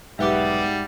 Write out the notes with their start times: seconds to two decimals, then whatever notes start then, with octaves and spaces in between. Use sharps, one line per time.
0.19 B1 G#2 G3 B3 G4 E5 F#5 D6